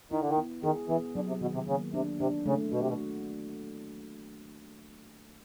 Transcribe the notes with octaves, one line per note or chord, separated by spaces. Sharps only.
D#3 E4
D3
D#3
B3
D#3 G#4
E3 B3
D3 F#3
C3
B2 D#3
C3
C#3 A#3
C3 D4
C3 D4
C#3 A3
B2 F#4
C3
B2